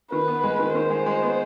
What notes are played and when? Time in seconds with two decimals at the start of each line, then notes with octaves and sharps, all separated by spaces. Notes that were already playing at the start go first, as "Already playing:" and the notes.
0.12 D#3 B4
0.28 B3
0.44 G#3
0.59 D#3
0.75 D#3 C5
0.90 G#3
1.06 G#3
1.22 B3